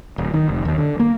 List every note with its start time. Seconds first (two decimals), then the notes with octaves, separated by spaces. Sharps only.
0.18 D1
0.33 D#3
0.48 F1
0.65 D#2
0.78 D3
1.00 A#3